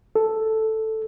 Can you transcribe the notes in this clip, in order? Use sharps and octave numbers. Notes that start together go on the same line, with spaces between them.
A4